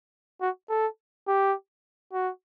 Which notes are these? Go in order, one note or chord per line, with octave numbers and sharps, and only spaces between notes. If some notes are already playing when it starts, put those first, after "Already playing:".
F#4
A4
G4
F#4